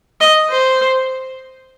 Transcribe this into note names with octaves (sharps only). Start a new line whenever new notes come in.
D#5
C5